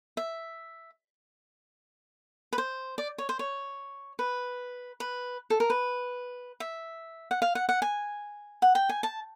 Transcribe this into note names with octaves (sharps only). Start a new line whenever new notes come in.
E5
B4
C5
D5
C#5
C5
C#5
B4
B4
A4
A#4
B4
E5
F#5
F5
F#5
F#5
G#5
F#5
G5
G#5
A5